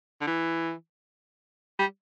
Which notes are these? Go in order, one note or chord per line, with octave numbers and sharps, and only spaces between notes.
D3
E3
G3